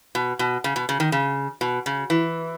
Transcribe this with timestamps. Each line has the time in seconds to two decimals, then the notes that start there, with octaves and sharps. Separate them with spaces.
0.15 B2
0.39 B2
0.64 C#3
0.76 B2
0.89 C#3
1.00 D#3
1.12 C#3
1.61 B2
1.86 C#3
2.10 E3